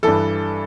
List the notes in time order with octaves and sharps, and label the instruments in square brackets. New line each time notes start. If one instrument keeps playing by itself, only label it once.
[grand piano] G2 E3 A4